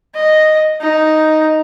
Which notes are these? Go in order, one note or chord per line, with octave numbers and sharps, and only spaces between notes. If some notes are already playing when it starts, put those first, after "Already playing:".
D#5
D#4